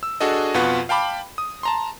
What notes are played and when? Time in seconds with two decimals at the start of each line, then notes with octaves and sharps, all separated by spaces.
0.03 E6
0.20 D4 F#4 G#4 A4 D#5
0.54 F2 B2 F4 B4 F#5 C#6
0.89 F5 G5 A5 B5 D6
1.38 D#6
1.63 A5 A#5 C6